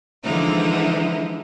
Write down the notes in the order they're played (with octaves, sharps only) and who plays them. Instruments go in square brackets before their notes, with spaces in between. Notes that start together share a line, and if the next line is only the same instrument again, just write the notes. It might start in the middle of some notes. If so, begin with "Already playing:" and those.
[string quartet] D3 E3 F3 G#3 D#4 E4